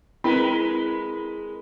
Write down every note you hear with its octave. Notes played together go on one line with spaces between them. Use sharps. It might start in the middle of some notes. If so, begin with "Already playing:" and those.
G#3 C4 E4 A#4 B4 B5